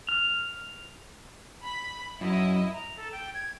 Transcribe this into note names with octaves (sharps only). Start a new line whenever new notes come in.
F6
B5
F#2 E4 D#5
A#5
A4
G5
G#6